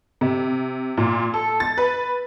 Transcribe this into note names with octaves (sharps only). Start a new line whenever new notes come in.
C3
A#2
A4
A6
B4